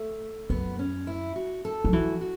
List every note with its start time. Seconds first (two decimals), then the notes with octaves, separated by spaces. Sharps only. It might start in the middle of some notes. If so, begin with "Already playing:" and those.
Already playing: A3
0.50 F#2 B3
0.79 C#4
1.07 E4
1.36 F#4
1.65 A4
1.85 F#3
1.93 E3 F#4
2.21 F#4